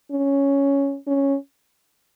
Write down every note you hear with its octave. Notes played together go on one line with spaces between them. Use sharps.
C#4
C#4